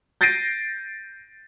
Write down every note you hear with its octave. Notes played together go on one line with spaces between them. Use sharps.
G6 A6 A#6 C7 D7 D#7